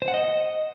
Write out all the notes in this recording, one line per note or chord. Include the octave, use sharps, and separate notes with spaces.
C5
F#5
D#5